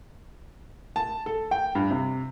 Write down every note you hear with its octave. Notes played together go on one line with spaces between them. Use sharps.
A5
A4
G5
G2
C3